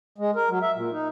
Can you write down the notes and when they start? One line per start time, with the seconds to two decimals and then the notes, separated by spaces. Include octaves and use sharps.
0.18 G#3
0.35 A#4
0.49 F#3
0.62 E5
0.76 A#2
0.92 D#4